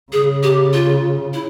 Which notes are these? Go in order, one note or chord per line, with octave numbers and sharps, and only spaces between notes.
C#3 G#4
G4
F4
E4